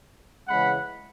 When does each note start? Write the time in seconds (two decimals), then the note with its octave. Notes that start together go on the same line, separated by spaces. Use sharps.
0.48 C#3 E3 G#3 C#4 F#5 B5